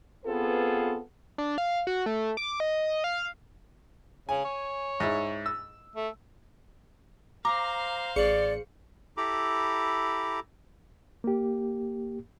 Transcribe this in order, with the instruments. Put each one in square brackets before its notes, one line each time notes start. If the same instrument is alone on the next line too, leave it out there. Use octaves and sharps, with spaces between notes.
[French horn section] B3 C4 F4 G#4 A4 B4
[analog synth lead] D4
F5
F#4
A3
D6
D#5
F5
[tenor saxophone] C#3 [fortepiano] G#5
[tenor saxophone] C#5
[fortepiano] G#2 E4
E6
[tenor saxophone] A3
[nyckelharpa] C5 F5 [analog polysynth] A#5 [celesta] D6
[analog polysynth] A1 C#7 [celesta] G#4 F#7 [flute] D5
[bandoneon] E4 G4 A4 A#5 B5 D6
[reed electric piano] A#3 G4